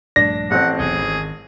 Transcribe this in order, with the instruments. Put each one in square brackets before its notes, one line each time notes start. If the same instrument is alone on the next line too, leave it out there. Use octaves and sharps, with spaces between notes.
[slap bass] A#1 G2 A3 [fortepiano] D4 [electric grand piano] A#6
[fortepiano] A1 C4 [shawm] F#5
[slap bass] E1 B1 C3 [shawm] G#4
[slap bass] G#1 D#3